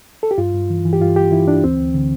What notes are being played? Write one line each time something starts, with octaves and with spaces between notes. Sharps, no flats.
A4
G4
G2 F4
G2
E3
E3
G4
G2 F4
G2 G4
E3 E4
E3 D4
D2 C4
D2
D3